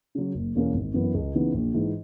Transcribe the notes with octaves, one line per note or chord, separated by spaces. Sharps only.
C#3 F#3
F#1
E2 B2 A#3 C#4
G#1
F#2 E3 B3
C#2
C#3 E3 B3 D#4
A#1
G#2 E3